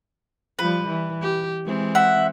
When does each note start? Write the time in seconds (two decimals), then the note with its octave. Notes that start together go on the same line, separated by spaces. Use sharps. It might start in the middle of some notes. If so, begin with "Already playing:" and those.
0.59 F3 G3 B4
0.88 E3
1.22 G4
1.65 E3 G#3 C4
1.95 E5 F#5